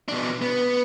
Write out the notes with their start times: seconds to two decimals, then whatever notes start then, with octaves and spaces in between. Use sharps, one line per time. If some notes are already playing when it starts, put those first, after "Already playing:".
0.08 B2 D4
0.42 B3